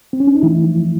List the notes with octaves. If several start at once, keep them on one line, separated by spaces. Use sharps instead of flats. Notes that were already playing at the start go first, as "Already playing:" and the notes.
C4
C#4
D4
D#4
E3 A3 E4
F3